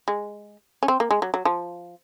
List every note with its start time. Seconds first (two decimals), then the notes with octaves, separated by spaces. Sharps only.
0.08 G#3
0.83 C#4
0.88 C4
1.00 A#3
1.11 G#3
1.22 F#3
1.34 F#3
1.45 F3